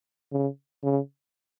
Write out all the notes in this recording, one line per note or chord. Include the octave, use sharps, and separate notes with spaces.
C#3
C#3